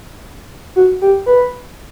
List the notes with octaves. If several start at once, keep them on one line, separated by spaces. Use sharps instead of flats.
F#4
G4
B4